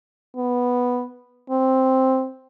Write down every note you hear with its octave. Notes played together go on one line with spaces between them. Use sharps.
B3
C4